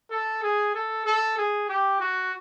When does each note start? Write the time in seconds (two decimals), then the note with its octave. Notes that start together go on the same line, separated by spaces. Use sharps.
0.11 A4
0.42 G#4
0.74 A4
1.06 A4
1.38 G#4
1.69 G4
2.00 F#4